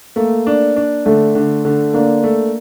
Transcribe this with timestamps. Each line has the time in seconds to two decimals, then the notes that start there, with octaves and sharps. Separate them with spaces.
0.16 A3 A#3
0.47 D4
0.76 D4
1.06 D3 A3
1.35 D3
1.65 D3
1.94 A#3 D4
2.23 A3